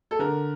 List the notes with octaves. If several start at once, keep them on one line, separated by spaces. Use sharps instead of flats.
A4
D3 A#4